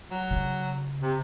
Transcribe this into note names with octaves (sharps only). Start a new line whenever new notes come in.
F#3
C#3
C3